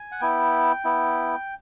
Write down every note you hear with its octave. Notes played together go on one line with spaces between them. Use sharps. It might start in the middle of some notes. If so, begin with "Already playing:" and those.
Already playing: G#5
F#5
B3 E4 G5
B3 E4